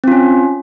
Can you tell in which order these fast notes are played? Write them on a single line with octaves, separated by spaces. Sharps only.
C4 F4 C#4